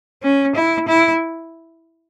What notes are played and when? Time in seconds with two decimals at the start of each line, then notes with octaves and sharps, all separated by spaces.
0.23 C#4
0.55 E4
0.88 E4